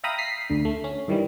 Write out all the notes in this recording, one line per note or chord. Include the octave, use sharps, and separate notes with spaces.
E5 F5 G5 A#5 B5 D#6
B6 C7
D2 D3
A3
C#4
G2 D#3 E3 G3